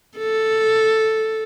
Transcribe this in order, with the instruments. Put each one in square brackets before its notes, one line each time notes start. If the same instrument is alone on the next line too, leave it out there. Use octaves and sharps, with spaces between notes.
[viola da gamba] A4